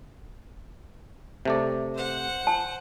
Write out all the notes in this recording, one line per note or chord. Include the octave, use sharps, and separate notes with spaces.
C3 A3 D5
C5 F#5
A5